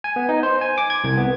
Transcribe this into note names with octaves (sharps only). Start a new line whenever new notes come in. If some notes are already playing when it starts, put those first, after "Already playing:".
G#5
B3
D#4
C5
G#5
D6
G#6
C2
B3